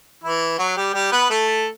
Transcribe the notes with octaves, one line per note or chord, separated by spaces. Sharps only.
E3 E4
F#3 F#4
G3 G4
G3 G4
B3 B4
A3 A4